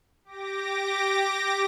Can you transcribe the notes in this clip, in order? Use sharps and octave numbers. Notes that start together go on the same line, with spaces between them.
G4 D6 A#6